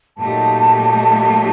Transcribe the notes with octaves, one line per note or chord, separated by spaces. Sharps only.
A#2 F#3 A3 D#4 G4 A5